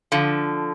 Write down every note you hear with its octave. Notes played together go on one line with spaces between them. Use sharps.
D3 F3